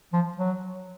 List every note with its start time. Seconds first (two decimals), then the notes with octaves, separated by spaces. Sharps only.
0.13 F3
0.37 F#3